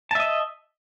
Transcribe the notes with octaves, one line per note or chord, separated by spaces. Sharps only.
D#5 E5 A5